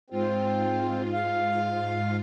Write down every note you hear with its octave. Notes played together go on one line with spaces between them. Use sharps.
G#2 C4 F4
F5